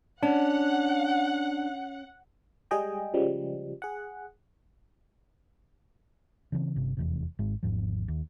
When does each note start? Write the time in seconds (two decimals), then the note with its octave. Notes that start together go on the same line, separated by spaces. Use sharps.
0.23 C#4 D4 F#5
2.71 G3 G#3 G#4 D#5 G5
3.14 C#3 F3 G3 G#3
3.82 G#4 F#5
6.52 C#3 E3 G#3 C4
6.76 G1 C3
6.97 F1 E2 C3
7.39 G#1 G#2 G#3
7.63 G#1 E2 G#2 F3
8.08 D#2